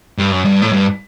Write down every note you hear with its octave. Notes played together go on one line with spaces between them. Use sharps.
G2
F#2
G2
A2
G2